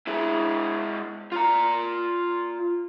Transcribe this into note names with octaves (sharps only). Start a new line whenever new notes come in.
G#3 E4
F4 A#5